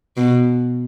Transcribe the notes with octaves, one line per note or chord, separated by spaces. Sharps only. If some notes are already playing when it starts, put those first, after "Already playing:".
B2